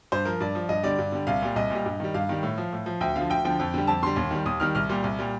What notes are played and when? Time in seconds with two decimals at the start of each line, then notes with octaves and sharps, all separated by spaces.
0.12 G2 C5
0.25 F3 A#4
0.40 G2 D5
0.55 F3
0.69 G2 D#5
0.83 D3 G3 D5
0.99 G2
1.12 D3 G3
1.27 C2 F5
1.42 A#2 G3
1.56 C2 D#5
1.70 A#2 G3
1.86 G2
2.00 D#3 G3
2.14 G2 F5
2.29 D#3 G3
2.43 A2
2.58 F3
2.73 A2
2.86 F3
3.01 D2 G5
3.16 D3 F3 F5
3.30 D2 G5
3.45 D3 F3 G5
3.60 F2
3.74 D3 G3
3.87 F2 A5
4.03 D3 G3 C6
4.16 D#2
4.31 D#3 G3
4.46 D#2 D#6
4.60 D#3 G3 F6
4.75 C2 F6
4.90 A#2 G3
5.04 C2
5.19 A#2 G3